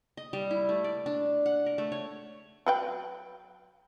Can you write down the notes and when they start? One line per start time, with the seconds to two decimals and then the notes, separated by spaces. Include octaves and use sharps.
0.17 D#5
0.33 G3
0.51 E4
0.69 A3
0.84 D5
1.06 D4
1.46 F#5
1.66 A#4
1.78 A3
1.92 C#5
2.66 F#3 B4 G5